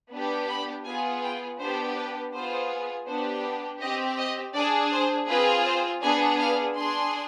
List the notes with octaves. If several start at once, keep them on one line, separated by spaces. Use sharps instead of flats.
B3 D4 G4
B5
B3 F4 G#4 G#5
G5
B3 D4 G4 C5
B4
B3 F4 G#4 C5
B3 D4 G4 C5
C4 G4 D#5
D#5
D4 G#4 D5
C5
C4 F4 G#4 B4
C5
B3 D4 G#4 G#5
F5
D4 G#4 C6